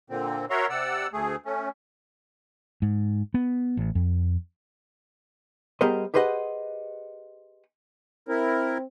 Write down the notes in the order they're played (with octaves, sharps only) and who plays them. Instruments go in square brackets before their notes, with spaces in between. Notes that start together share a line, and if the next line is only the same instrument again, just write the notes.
[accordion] A#2 D3 C4
F#4 A#4 C#5 E5 A#5 C6
C3 D5 F#5 E6
D2 A3 G#4
A3 C#4
[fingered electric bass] G#2
B3
A1
F2
[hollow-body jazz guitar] G3 B3 G#4 A#4 C5 D#5
G4 G#4 B4 C5 D#5 F#5
[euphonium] C4 [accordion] E4 A#4